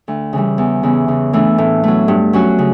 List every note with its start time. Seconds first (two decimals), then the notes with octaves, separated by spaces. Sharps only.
0.08 D2
0.33 C#3 E3 G3
0.58 E2
0.83 C#3 E3 B3
1.08 C#3
1.33 E3 A3 D4
1.58 A2
1.83 F#3 A3
2.08 G2
2.33 F#3 C#4 F#4
2.59 C#3